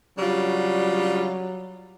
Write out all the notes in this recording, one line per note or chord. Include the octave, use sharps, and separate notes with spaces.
C#3 F#3 G3 D4 F4